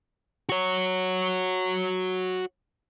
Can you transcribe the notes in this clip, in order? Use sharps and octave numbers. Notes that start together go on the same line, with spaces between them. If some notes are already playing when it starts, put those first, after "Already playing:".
F#4 C#5